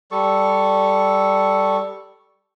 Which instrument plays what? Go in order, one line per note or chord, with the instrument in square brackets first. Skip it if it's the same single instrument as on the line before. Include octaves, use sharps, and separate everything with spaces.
[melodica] G3 A4 C#6